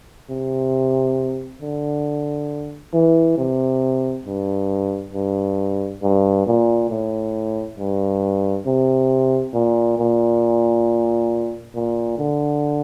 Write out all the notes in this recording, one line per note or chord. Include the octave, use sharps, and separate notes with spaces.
C3
D3
E3
C3
G2
G2
G2
A#2
A2
G2
C3
A#2
A#2
A#2
D3